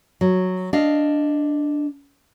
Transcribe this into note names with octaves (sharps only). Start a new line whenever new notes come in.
F#3
D4 D#5 F5